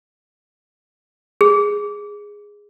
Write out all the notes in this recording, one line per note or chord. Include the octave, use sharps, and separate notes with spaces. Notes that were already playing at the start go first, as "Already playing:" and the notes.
G#4